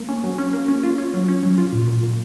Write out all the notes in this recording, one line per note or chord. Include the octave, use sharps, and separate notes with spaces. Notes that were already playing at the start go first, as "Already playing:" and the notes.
Already playing: A#3
C#4
F#3
C#4
A#3
C#4
F4
C#4
F#3
C#4
F#3
F4
A#2
A#2
A#2